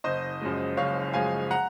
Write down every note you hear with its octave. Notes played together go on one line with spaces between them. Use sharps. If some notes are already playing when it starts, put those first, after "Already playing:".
F#1 C5 D#5
F#2 F3 G#3
F#1 C#5 F5
F#2 F3 G#3 F5 G#5
F#5 A#5